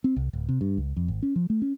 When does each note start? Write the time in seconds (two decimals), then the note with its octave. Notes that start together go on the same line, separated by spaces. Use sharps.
0.04 C4
0.16 C2
0.33 D1
0.49 C3
0.61 G2
0.77 C#2
0.96 F2
1.08 G#1
1.22 C#4
1.36 F3
1.50 A3
1.62 C#4